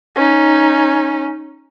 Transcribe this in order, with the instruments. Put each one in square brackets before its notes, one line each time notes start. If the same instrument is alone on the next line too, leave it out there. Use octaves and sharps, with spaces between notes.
[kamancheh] C#4 D#4